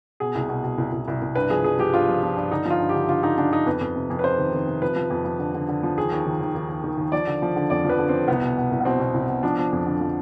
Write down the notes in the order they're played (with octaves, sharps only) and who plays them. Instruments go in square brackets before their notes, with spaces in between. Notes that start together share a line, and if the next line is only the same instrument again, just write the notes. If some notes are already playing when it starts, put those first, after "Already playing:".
[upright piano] B2 G#4
C2
B2
B2
C2
C2
C2
C2
G2 B4
F3 G#4
F3 G#4
F3 G4
G2 F4
F3
F3
G2
D3 D#4
F3
F4
G2
D3 G4
D3 F4
D3 D#4
D3 D4
D3 D#4
F2 B4
F2
C3
F2
B4
C3 C5
D#3
D#3
C3
F3 B4
F3
F2
F3
D3
D3
D3
F3
D#2 G#4
D#2
D#3
D#2
D#2
D#2
D#3
D#2
F3 D5
D3
F3
D3
F2 D5
F3 B4
D3
F2 C4
C2 B3
B2
B2
C2
B3
B2 C4
B2
C2
B2
F3 D4
F3
F2
D3
F3